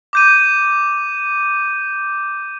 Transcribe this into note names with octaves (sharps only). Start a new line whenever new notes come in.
D6 G6 D#7